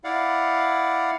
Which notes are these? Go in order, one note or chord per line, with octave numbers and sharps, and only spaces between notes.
E4 D5 F5 F#5